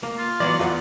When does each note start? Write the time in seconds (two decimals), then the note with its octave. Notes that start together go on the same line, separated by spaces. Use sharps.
0.03 A#3
0.18 F4
0.40 E3 F#3 B3 D5
0.59 E2 F4 D#5 F#5